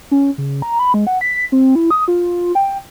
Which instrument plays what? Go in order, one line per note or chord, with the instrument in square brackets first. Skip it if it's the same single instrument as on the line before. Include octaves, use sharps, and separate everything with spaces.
[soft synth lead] C#4
C#3
A#5
B5
G#3
F#5
B6
C4
E4
D#6
F4
G5